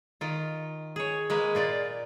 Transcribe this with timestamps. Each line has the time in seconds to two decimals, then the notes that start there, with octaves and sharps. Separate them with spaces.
0.21 D#3 F4
0.96 G#4 C#5
1.30 G#3 A#3 B4
1.55 A#2 F4 D5